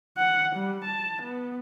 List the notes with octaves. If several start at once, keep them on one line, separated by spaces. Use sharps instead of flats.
F#5
G3
A5
B3